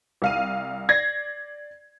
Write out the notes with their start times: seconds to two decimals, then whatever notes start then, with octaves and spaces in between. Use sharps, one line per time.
0.22 C2 F5 D#7
0.89 D5 G#6 A#6 C7